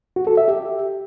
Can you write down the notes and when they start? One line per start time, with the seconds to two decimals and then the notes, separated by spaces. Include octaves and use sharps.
0.16 F#4
0.27 A4
0.37 E5
0.48 G4